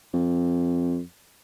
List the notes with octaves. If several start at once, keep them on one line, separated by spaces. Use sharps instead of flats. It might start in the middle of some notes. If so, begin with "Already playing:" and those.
F2